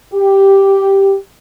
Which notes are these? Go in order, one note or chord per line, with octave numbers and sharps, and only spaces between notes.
G4